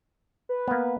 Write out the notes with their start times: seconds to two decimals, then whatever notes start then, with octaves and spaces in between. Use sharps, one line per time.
0.49 B4
0.68 A#3 B3